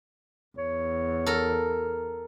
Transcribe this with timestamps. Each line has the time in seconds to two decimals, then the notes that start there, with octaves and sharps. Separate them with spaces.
0.58 E2 C#5
1.26 A4 A#4